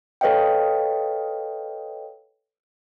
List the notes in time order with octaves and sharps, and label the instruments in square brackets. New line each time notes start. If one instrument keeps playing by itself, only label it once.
[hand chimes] A4 B4 C#5 D#5 F5 G5